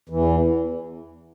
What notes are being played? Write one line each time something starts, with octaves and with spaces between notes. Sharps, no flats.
E2 E3